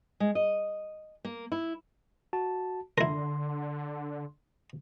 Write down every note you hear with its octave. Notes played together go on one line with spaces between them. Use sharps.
G#3
D#5
A#3
E4
F#4 A5
D3 E4 A#4 C6